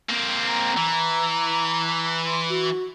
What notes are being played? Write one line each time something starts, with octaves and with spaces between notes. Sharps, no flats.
A#3 C4
A#5
E3
C6
F#4